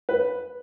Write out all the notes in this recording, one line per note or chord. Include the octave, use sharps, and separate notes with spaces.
B4